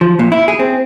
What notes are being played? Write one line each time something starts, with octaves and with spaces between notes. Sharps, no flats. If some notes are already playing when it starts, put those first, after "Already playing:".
F3
A#2
E4
G#4
C4